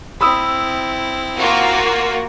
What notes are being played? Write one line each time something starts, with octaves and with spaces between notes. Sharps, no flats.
C4 E4 B5 D#6 E6
A#3 F4 F#4